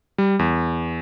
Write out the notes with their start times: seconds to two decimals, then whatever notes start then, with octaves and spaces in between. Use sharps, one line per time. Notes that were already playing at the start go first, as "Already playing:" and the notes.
0.18 G3
0.39 E2